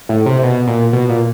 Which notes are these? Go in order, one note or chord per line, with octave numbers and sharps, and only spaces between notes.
A2
C3
B2
A#2
B2
A#2